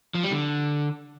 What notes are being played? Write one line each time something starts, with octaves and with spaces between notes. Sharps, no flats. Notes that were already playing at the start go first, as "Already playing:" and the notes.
F3
G3
D3